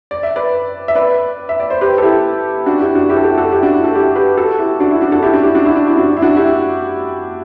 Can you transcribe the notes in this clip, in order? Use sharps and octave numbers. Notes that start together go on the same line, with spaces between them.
D5
E5
B4 D5
E5
B4 D5
E5
D5
C5
G4 B4
A4
E4 G4
D4 F#4
E4 G4
D4 F#4
E4 G4
A4
E4 G4
F#4 A4
E4 G4
D4 F#4
E4
F#4 A4
E4 G4
G4 B4
F#4 A4
E4 G4
D4 F#4
E4
D4 F#4
F#4 A4
E4 G4
D4 F#4
E4 G4
D4 F#4
E4
D4
E4
D4 F#4
E4
D4 F#4
E4 G4